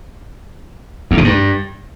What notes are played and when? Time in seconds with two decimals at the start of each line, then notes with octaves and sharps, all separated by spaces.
1.11 E2
1.18 B2
1.24 G2